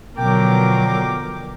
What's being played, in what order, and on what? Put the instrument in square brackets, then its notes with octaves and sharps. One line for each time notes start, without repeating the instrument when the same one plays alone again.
[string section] B2 D3 F3 [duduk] F#3 [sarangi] A#4 [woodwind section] G5 D6